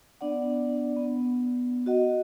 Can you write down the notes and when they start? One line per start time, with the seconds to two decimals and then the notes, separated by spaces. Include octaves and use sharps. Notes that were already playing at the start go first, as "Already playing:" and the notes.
0.21 B3 D4 D5 F#5
0.96 B3
1.86 F#4 D#5 F#5